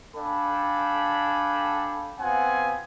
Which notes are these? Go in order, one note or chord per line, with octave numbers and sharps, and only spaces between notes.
D4 A4 F5 G5 G#5 B5
B3 C4 F4 F#5 G#5